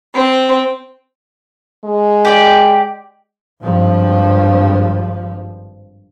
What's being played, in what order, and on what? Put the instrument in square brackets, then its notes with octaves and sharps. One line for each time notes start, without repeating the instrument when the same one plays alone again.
[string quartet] C4
[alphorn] G#3
[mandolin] G4 D5 G5
[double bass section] G#1 G2 F3